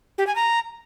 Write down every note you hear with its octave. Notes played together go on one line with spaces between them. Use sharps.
G4
G#5
A#5